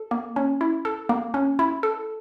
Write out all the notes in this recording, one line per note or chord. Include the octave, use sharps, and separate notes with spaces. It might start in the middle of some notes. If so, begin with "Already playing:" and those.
Already playing: A4
A#3
C#4
E4
A4
A#3
C#4
E4
A4